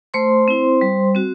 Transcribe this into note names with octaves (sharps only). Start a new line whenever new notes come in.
A3 C5 C6
C4 E4
G3
C4 F#4